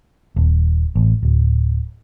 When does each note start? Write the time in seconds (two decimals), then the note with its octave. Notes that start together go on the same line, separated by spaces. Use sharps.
0.36 D#1
0.96 A1
1.23 D1